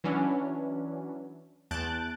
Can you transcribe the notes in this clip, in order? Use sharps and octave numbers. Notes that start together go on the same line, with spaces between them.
E3 F#3 C#4 D4
E2 A5 F#6 G6 A6 D7